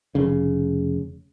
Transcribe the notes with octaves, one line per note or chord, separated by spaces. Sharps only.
F1 C#3